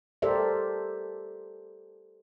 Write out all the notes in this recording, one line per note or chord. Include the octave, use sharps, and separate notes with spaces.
G4 A4 A#4 C5 D5 E5